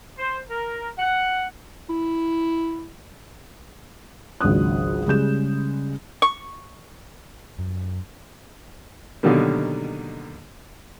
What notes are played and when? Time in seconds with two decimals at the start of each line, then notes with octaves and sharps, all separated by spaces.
0.17 C5
0.49 A#4
0.97 F#5
1.89 E4
4.41 G#1 C#2 F#3 D4 D#6 F#6
5.06 C#3 G3 G#3 G6 E7
6.22 C#6
7.59 F#2
9.23 B2 D3 D#3 F#3 G3 A#3